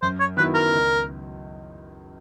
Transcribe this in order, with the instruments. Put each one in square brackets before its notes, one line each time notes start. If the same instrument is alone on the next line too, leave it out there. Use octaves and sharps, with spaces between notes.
[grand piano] F#2 [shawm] C5
[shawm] C#5
[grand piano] D#3 F#3 B3 E4 [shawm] B4
[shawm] A#4
[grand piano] C#2